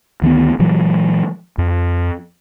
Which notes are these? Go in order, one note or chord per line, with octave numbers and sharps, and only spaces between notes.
D2 D#3 G3 B3
A#2 E3 F#3 G#3
F2